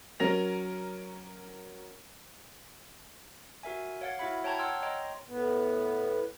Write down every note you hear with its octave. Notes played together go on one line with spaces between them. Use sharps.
F#3 C#4 A#4 A#6 F7
F#4 A#4 E5 G#5
C#5 F5 F#5 G#6 A6
E4 F#4 E5 F#5 B5
C#5 G5 A5 A#5 C#6 G#6
C#5 F#5 G5 C6 E6 F6
C#5 D#5 G5 A#5 C6
A2 B3